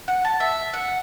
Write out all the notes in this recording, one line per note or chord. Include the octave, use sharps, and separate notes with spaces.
F#5
A5
E5
F#5